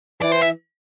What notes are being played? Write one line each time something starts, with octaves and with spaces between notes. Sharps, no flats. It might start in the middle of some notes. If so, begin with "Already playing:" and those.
E3 D5
C5
E5